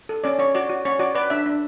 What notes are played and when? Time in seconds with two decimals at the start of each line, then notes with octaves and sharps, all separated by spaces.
0.09 A4
0.24 C#4 D5
0.39 C#4 C#5
0.55 F#4 D5
0.69 F#4
0.85 C#4 C#5
0.99 F#4 D5
1.15 B4 D5
1.30 D4 E5
1.46 D4